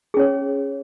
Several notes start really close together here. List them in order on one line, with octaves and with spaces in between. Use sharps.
G#4 C#4 C#5